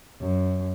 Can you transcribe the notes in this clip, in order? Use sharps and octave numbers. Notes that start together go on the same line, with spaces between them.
F#2